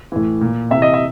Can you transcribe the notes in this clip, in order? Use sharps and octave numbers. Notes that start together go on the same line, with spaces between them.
A2 E3
A#2
C3 E3 E5
D#5
E5